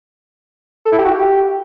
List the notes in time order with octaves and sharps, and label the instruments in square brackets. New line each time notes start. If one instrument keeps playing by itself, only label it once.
[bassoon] A4
E4
G4
F#4
G4